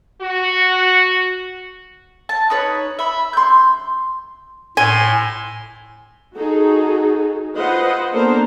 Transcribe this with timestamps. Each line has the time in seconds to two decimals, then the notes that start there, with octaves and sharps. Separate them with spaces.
0.21 F#4
2.29 A5
2.50 D#4 B4 C#5
2.99 E5 B5
3.33 C6 G6
4.77 A2 G#5 C6
6.37 D#4 F#4 G#4 A4
7.56 F4 B4 C5 D#5 F#5
8.12 A#3 B3 D4 A4 A#4 C5